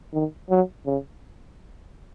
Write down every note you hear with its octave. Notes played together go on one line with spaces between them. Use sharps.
D#3
F#3
C#3